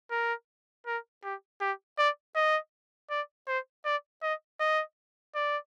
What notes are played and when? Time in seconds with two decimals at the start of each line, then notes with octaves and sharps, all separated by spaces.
0.11 A#4
0.87 A#4
1.24 G4
1.61 G4
1.98 D5
2.36 D#5
3.10 D5
3.48 C5
3.85 D5
4.23 D#5
4.60 D#5
5.35 D5